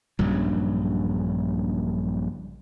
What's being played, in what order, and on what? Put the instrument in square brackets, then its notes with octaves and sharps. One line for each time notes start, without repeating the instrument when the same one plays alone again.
[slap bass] A#1 G2 C#3 F#3